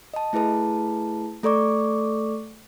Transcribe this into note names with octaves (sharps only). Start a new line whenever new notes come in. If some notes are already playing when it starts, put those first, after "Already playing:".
D#5 A5
A3 E4 G#4 B4 A5
A3 A4 D5 C#6 D6